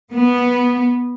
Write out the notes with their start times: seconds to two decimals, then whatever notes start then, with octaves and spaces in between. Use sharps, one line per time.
0.11 B3